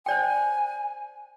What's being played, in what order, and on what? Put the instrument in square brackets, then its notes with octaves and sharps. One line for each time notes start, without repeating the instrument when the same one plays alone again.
[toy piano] C5 D5 G5 [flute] G#5